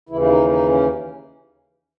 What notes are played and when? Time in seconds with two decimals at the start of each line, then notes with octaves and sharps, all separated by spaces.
0.09 D#2 C#3 E3 E4
0.21 E4
0.29 D#4
0.49 D#4
0.69 C#4